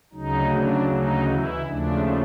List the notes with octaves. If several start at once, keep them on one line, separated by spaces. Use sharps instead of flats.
D2 C#3 F#3 D#4
D4
D#4
E3 E4
D#2 C#3 F3 A3 D4